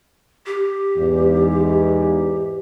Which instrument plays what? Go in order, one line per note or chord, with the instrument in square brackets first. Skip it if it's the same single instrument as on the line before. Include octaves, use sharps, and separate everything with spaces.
[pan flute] G4
[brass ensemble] E2 G#2